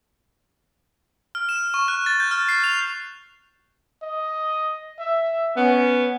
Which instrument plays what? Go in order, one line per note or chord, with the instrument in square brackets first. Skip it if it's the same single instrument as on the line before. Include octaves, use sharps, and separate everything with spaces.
[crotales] F6
E7
C#6
F#6
A6
G6
F6
C7
F7
[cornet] D#5
E5
[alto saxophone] B3 [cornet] C#4